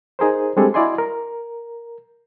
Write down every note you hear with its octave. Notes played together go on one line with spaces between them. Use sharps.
D#4 G#4 A#4 C5
G3 G#3 C4 D4 G#4 A4
E4 F#4 D5 D#5 G#5 C6
A#4